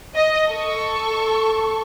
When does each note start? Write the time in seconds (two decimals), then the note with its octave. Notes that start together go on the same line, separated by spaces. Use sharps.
0.15 D#5
0.50 A4 C#6